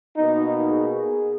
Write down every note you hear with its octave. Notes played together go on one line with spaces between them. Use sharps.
B2 A#3 D#4
G#4